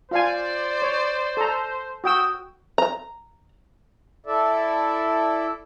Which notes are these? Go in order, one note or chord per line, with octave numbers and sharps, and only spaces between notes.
F4 C5 D5 F5 G#5
C#5
A4 A#5
F#4 G5 D#6 E6
A#5
E4 A4 D5 E5